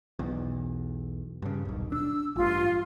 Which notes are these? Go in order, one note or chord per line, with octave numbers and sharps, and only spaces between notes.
B1 E2
G2 C#3
D#1 B1
D4 E6
A1 G2 F4